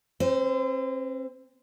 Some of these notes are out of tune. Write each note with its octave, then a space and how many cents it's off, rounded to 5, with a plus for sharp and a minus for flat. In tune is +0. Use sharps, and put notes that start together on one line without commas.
C4 +35 C5 -35